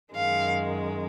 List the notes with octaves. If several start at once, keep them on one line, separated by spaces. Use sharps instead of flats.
F#2 D#3 G#3 F5